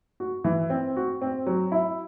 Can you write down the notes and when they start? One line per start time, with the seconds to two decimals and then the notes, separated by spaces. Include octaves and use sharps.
0.20 F#4
0.44 E3
0.70 C4
0.97 F#4
1.22 C4
1.46 F#3
1.72 E4